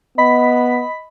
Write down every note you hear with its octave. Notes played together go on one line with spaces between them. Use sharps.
B3 D#5 B5 B6